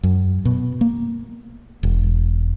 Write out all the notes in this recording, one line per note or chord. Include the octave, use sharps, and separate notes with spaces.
F#2
B2
A#3
E1